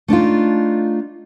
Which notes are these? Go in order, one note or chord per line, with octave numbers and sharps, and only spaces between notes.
A3 D4 D#4 F4